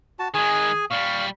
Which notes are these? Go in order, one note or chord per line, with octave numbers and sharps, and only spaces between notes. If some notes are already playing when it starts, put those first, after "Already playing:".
F#4 A5
D#3 G#3 G#4 G#5
A#2 G3 F5 C#6